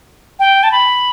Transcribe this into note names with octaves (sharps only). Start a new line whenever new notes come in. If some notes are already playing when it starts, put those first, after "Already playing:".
G5
A5
B5